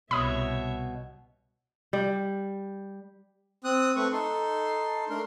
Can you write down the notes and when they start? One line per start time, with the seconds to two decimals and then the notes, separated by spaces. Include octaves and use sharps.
0.11 C2 B2 C#5 E5 B5 D#6
1.93 G3
3.64 C4 D#6 F#6
3.96 A3 C4 B4 C#6
4.12 D#4 A4 C6
5.10 A3 D4 A#4 C6